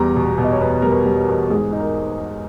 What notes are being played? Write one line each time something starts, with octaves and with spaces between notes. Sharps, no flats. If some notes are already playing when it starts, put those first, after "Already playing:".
Already playing: E2 G3 A#5
B2
B2
D#5
C#5
E2 B4
G3 A#4
B4
G3
A#4
E2
G#2 G#4
D#4
A#4